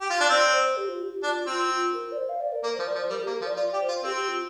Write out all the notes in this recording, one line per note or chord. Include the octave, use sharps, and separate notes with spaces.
G4
F4
D4
C4 D5
C5
G4
F4
G4
G4
D4 F4
C4 F4
F4
A#4
D5
C5
F5
D5
A#4
A#3 A#4
F3 C5
D5
F3
C5
G3 A#4
A#3 G4
A#4
F3
D5
F4 D5
G4
C5
F4
C4 G4
G4
F4